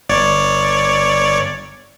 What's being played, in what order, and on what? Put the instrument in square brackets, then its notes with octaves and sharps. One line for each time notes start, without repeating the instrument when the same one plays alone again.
[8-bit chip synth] G1 C#5 D5